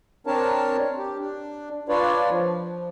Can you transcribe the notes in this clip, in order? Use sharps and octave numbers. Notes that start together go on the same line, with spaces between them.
C4 D4 A#4 C#5 A5
G4
D4
D4 F4 B4 C#5 D5
F3